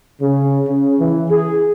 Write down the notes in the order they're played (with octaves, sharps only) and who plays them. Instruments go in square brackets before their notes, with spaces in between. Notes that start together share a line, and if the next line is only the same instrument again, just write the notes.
[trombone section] C#3
C#3
E3
G#4